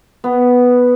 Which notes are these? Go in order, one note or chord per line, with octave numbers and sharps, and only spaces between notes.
B3